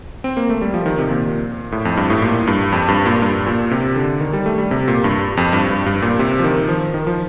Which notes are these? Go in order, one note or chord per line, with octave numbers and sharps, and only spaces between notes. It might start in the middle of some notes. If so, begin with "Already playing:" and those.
C4
A#3
A3
G3
F3
D#3
C3
A#2
A2
F2
G2
A2
A#2
G2
F2
G2
A#2
G2
A#2
C3
D3
D#3
G3
A3
G3
C3
A#2
G2
F2
G2
G2
G2
A#2
C3
F3
D#3
F3
D#3
F3